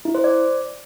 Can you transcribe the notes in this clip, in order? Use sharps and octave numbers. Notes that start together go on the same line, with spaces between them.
E4
C5
D5